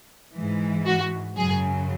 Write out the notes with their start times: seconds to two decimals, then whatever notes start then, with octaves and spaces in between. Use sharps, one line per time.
0.35 G#2 E3
0.85 F#4
1.36 F#2 C#3 F#3 G#4